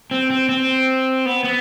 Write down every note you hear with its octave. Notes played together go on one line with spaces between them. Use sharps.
C4
C4
C4
B3
B3